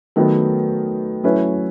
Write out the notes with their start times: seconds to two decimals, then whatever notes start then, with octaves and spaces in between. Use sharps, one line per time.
0.16 D#3 F#3 A3 B3 A4
1.24 F#3 A3 C#4 E4 F#4 B4